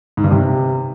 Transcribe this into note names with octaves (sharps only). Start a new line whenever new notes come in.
G#2
G2
C3